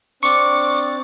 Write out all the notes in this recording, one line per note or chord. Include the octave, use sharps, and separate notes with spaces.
C4 D4 C#6 D6